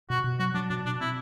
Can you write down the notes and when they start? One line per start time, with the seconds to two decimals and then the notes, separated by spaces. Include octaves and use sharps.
0.10 B2 F#4
0.24 B2
0.39 F#3 F#4
0.54 F#3 D4
0.70 B2 D4
0.85 B2 D4
1.00 C4 E4